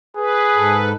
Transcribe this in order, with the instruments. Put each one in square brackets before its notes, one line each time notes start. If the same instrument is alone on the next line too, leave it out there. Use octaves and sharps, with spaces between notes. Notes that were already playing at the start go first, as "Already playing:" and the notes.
[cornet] G#4 [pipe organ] B4
[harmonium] G#2 A4